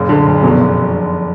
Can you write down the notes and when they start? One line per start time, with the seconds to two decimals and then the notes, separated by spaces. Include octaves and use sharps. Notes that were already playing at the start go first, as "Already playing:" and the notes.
Already playing: F#1 A#2
0.09 D3
0.26 F#1
0.42 F1 B1 B2